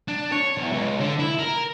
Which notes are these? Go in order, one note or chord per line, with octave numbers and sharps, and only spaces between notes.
D4
C#5
E2
C#2
D3
E4
A#4